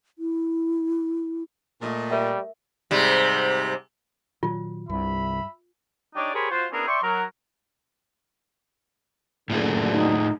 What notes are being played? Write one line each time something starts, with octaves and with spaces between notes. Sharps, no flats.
E4
A#2 A3 D#5
G3 A#4 E5
G#2 C3 G3
A#2 D#3 F#3 F4
C2 G2 E5 B5
D4 D#4 G4 C#5 D5
G4 G#4 A#4 C5 C#5 B5
F4 F#4 C5
B3 C#4 D4 E4 G#4 A#4
D5 E5 G5 C6 C#6
F#3 A#4
F#1 A2 D3 F4 G#4
D#4